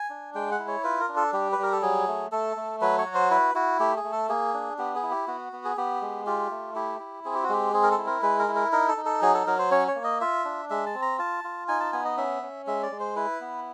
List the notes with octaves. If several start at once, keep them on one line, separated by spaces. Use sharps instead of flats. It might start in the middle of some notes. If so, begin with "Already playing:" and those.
Already playing: G#5
D4
G#3 G5
F#5
E4
C#5
F4 B4
A#4
D4
A4
G3 G4
B4
G3 A#4
A4
F#3 G#4
A3
A3 A4
A3
F#3 B4
C#5
F#4
C5
E4 B4
E4 F#4
A3 G4
G#4
A3
A4
A#3 G#4
D4
B3 G4
G#4
E4
G4
B3 F#4
B3
G#4
B3 G4
G#3
F4 G4
A3
E4 G4
E4
C4 G#4
G4
F#4
G#3 G4
C4 G#4
A#4
A4
E4
A#4
G#3 B4
A#4
E4
A#4
D#4 A#4
A4
D#4
A4
F#3 G#4
A4
F#3 A#4
C5
C#4 C#5
C#5
A#3
D#5
F4 E5
D4
G#3 E5
A5
C4
A#5
F4 A5
F4
D#4 G#5
A5
B3 G#5
D#5
C#4 E5
C#4
G#3 E5
D5
G#3
C5
E4 B4
B3